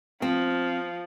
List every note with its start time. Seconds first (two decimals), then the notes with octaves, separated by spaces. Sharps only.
0.22 F3 C4